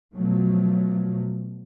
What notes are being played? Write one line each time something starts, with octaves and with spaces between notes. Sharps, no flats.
B2 F3 F#3 A3